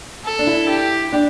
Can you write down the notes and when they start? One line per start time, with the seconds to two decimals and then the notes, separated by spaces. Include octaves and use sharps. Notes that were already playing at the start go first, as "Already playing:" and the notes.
0.25 A4
0.39 D4
0.47 E4
0.69 G4
1.12 D4